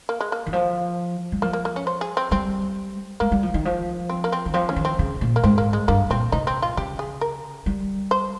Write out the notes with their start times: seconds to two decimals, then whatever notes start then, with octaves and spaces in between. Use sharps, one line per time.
0.09 A#3
0.21 G#3
0.32 A#3
0.46 D#3
0.53 F3
1.32 G3
1.42 F3 A#3
1.53 A#3
1.65 A#3
1.76 C#4
1.87 C5
2.01 G#4
2.17 C4
2.31 G3 C4
3.20 G#3 A#3
3.32 G3
3.43 F3
3.54 D#3
3.65 F3
4.09 C4
4.24 A#3
4.32 C4
4.46 D#3
4.54 F3 C4
4.69 C#4
4.76 D#3
4.85 C4
4.99 C#3
5.21 A#2
5.36 A#3
5.44 G#2 C4
5.58 A#3
5.73 G#3
5.88 G2 A#3
6.10 A#2 C4
6.32 C3 D#4
6.47 C4
6.62 F4
6.77 C#3 G4
6.99 G#4
7.21 A#4
7.66 G3
8.11 C5